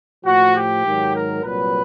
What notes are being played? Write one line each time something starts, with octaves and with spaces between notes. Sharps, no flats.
A2 F3 F#4
G4
G#2 D#3 F#3
A#4
C2 A#2 F#3 B4